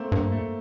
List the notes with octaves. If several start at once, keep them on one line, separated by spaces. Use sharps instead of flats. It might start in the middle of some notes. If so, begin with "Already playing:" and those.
Already playing: A3 A#3 C4
G2 A#3
A3